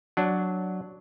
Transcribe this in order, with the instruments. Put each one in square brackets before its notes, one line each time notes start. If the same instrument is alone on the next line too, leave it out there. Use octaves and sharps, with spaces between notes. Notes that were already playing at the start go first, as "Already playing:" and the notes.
[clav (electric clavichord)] F#3 D4